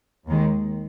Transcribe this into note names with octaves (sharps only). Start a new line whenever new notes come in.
D#2 D#3 G#3